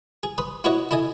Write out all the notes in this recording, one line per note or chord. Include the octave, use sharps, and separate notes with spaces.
G#4
B4 C6 D#6
E4 F#4 B4 C#5 D#5 F#5
E4 A4 D#5 G#5